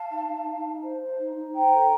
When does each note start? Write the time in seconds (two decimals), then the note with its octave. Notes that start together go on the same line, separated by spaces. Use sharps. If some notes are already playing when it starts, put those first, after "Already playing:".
Already playing: F5 A5
0.09 D#4
0.27 D#4
0.45 D#4
0.64 D#4
0.82 C5
1.00 C5
1.18 D#4
1.36 D#4
1.53 C5 G5 A#5
1.73 A4